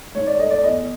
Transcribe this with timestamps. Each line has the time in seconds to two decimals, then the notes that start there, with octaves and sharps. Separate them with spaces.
0.15 G#2 C#5
0.27 D5
0.39 A3 D#5
0.50 D5
0.63 E2 D#5